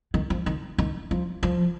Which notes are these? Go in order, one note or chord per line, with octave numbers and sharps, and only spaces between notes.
D#3
F3
D#3
D#3
F3
F3